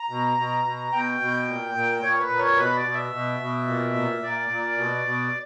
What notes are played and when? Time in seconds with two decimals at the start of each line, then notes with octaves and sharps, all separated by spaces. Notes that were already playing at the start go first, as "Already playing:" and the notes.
Already playing: A#5
0.10 B2
0.37 B2
0.65 B2
0.92 B2 G5
1.20 B2
1.47 A#2
1.75 A#2
2.02 A#2 C#5
2.21 B4
2.30 A#2
2.39 C#5
2.57 B2 B4
2.76 D5
2.85 B2
2.94 E5
3.12 B2
3.40 B2
3.67 A#2
3.95 A#2
4.23 A#2 D5
4.50 A#2
4.77 B2
5.05 B2